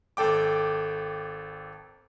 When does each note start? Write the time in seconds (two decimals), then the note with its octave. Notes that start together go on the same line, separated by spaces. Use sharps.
0.17 G#1 A4 G5 D6